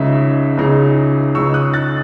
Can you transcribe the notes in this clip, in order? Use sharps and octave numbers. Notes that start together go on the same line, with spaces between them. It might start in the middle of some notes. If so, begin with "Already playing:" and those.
Already playing: C#2 C#3 G#3 D#4 E5
C#2 C#3 G#3 D#4
C#2 C#3 G#3 D#4 C#6 E6
D#6 F#6
F#6 A6